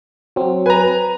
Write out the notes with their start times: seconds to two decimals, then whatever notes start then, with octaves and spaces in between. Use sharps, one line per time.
0.36 F#3 C4
0.66 B4 G#5 A#5